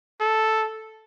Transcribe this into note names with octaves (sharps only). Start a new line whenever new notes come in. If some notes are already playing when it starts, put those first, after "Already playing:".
A4